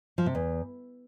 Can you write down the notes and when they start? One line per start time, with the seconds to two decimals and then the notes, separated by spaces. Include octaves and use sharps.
0.18 F3
0.26 C3
0.35 E2